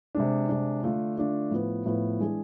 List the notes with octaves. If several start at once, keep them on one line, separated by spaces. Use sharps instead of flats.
C3 G#3 D4
C3 G#3 D4
D3 A3 D4 F4
D3 A3 D4 F4
A2 F3 B3
A2 F3 B3
E3 G#3 D4 G#4